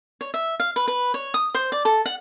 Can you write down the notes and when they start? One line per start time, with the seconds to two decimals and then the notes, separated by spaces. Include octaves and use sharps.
0.21 C#5
0.34 E5
0.60 F5
0.76 B4
0.88 B4
1.14 C#5
1.34 D#6
1.55 C5
1.72 D5
1.85 A4
2.06 F#5